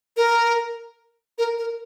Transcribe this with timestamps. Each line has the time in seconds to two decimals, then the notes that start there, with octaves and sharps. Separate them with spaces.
0.17 A#4
1.38 A#4
1.58 A#4